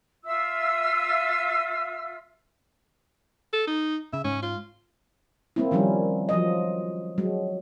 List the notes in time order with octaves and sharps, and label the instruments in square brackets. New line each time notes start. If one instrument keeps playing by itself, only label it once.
[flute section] F4 E5 E6
[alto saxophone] A4
D#4
[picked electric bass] C#3 [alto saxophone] E5
[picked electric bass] G#2 [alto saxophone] C#4
[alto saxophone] F4
[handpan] A#3 C4 E4
D#3 F3 G3 C#4 E4
F3 F#3 D#5
F#3 G#3